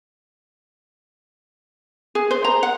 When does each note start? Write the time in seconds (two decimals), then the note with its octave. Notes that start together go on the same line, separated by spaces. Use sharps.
2.15 G#4
2.31 C5
2.44 A#5
2.63 F#5